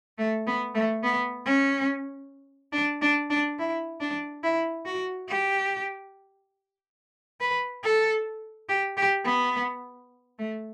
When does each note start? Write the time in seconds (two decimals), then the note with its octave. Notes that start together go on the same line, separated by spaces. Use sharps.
0.18 A3
0.47 B3
0.75 A3
1.03 B3
1.45 C#4
2.73 D4
3.02 D4
3.30 D4
3.59 E4
4.00 D4
4.43 E4
4.86 F#4
5.29 G4
7.41 B4
7.84 A4
8.69 G4
8.97 G4
9.25 B3
10.39 A3